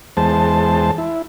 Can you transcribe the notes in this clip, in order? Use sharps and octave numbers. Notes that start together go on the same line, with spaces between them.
E2 G#3 C5 A5
E4